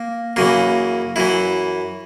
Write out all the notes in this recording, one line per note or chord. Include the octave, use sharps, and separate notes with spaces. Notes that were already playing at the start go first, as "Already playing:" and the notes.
Already playing: A#3
F#2 C#3 E3 A#3
F#2 E3 E4